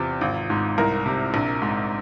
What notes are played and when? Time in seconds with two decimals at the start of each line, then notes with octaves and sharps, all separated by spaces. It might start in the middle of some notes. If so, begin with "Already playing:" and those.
Already playing: E2 C3 F4
0.21 G#1
0.50 G#2
0.78 C2 A#4
1.06 C3
1.34 A#1
1.62 G#2